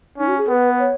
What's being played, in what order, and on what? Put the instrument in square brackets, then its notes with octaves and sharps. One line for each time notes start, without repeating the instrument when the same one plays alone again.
[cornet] C#4 [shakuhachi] D#4
[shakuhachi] F#4
G#4
[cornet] B3 [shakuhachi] B4
[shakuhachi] C#5